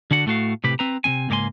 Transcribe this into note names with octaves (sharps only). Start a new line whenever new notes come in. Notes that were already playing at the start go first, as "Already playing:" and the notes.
D3 D4 F#4 F#5
A2 A3 F#4 F5
A2 C3 G4 B4
C4 B4 A#5
C3 D#3 C4 G#5
C#2 G#2 A#3 C#5 G#5 C6